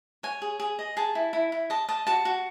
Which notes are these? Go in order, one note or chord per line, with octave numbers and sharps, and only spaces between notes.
C#5 G#5
G#4
G#4
D#5
G#4 A5
E4
E4
E4
D#5 A5
D#5 A5
F#4 A5
F#4